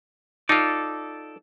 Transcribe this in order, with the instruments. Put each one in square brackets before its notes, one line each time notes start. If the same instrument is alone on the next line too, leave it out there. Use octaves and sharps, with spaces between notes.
[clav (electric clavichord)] D#4 F4 [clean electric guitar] A4 D5